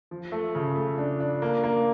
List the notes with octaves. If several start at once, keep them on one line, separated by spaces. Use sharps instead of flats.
F3
A3
C#3
A3
D4
D4
A#3
A#3